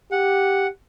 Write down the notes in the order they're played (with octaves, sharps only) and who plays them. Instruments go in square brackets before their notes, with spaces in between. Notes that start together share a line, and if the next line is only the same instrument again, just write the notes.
[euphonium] G4 [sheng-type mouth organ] F#5